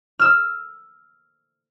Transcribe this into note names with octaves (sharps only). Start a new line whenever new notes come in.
E6 F6